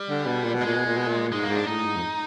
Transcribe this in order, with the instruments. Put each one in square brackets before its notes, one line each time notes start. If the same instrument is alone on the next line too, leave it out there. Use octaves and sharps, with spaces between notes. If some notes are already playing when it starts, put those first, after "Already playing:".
Already playing: [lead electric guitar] G3
[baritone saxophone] D3
B2
A#2
B2
[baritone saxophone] A#2 [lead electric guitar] G#3
[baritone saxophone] B2
A#2
B2
A#2
[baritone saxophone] G#2 [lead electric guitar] G#3
[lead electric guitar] A#3
[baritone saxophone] G#2
[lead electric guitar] D4
[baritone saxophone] A2 [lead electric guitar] D#4
[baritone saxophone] G#2
F2